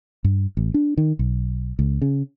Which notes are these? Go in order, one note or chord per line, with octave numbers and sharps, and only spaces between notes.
G2
A1
D4
D#3
B1
C#2
C#3